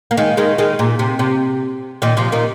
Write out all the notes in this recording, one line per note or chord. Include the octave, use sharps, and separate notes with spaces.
A#3
D#3 G#3
D#3 G#3
D#3 G#3
A#2
C3
C3
A#2 D#3
C3 F3
A#2 D#3